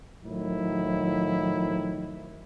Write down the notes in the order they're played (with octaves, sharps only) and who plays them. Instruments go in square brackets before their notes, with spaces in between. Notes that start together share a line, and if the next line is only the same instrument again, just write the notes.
[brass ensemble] A2 D#3 F3 F#3 E4